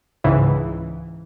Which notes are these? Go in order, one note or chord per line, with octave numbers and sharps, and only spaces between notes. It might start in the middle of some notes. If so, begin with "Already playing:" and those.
C#2 G#2 C#3 E3